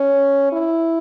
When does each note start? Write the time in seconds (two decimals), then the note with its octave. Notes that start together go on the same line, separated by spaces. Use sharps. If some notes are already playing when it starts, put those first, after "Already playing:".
Already playing: C#4
0.52 E4